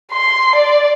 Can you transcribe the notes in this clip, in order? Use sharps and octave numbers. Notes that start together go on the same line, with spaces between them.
C6
D5